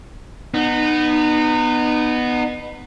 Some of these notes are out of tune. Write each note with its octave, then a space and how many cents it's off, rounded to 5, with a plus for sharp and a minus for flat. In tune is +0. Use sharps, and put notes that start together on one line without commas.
B3 +0 D#4 -30